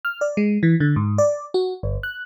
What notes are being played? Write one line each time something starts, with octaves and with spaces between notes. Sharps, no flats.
F6
D5
G#3
E3
D3
G#2
D5
F#4
G1
F#6